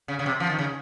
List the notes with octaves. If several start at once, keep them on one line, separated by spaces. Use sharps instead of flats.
C#3
C#3
C3
F3
D#3
C#3